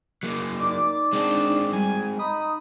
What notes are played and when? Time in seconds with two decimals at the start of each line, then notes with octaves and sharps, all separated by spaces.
0.23 F#3 A#3
0.60 D#4 D5 D6
1.13 G#3 C4 D4
1.73 G3 G#5
2.19 D#4 B5 D#6